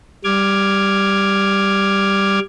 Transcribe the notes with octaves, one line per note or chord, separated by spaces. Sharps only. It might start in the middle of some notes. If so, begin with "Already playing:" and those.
G3 D6 F6 G#6